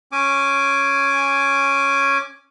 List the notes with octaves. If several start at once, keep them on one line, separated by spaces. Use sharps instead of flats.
C#4 G#5 D6